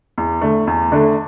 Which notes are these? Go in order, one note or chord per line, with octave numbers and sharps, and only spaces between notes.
E2
D3 A3
E2
D3 A3